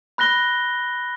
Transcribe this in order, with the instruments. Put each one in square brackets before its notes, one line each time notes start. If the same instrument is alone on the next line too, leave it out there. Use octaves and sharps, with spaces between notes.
[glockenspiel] B5 F#6 A#6 G7